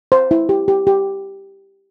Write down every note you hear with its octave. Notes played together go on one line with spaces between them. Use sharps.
C5
E4
G4
G4
G4